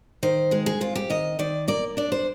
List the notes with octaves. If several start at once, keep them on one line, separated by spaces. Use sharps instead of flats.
D#3 C5
G#3 G#4
G#4
C4 F4
G4
D#3 D#5
D#3 D5
A#3 D5
D4 D5
C5